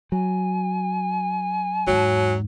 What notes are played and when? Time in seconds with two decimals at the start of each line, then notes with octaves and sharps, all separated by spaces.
0.12 F#3 G#5
1.87 E2 G#2 F#3